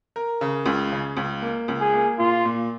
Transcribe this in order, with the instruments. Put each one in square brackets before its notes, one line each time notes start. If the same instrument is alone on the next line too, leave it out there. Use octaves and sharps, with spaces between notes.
[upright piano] A#4
C#3
C#2
C#3
C#2
A#3
C#2
[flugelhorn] G#4
[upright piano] A#3
[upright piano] A#2 [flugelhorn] F4
[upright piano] A#2